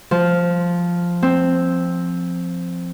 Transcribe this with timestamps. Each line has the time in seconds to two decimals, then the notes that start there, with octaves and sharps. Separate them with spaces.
0.11 F3
1.23 C4